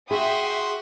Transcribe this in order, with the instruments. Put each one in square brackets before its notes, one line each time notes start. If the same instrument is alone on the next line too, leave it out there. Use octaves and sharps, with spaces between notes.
[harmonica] F#4 C6 [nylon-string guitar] G#4 [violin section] E5 G5 D#6